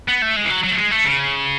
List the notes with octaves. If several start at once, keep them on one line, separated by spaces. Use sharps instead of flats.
B3
A3
G#3
E3
F#3
F#3
A3
G#3
A3
C#3